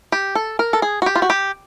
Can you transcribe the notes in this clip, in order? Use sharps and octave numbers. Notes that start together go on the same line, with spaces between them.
G4
A4
A#4
A4
G#4
F#4
G4
F4
F#4
G4